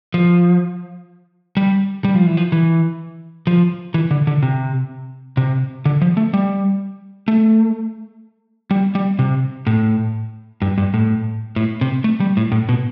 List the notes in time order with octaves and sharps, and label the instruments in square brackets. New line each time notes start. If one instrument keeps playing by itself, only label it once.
[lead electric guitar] F3
G3
G3
F3
E3
F3
E3
F3
E3
D3
D3
C3
C3
D3
F3
A3
G3
A3
G3
G3
C3
A2
G2
G2
A2
A2
C3
A3
G3
A2
A2
B2